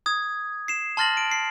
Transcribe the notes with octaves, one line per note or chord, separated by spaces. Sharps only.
D#6 G#6
C7 E7
A5 C6 F6 A6 A#6 F#7
D7
C7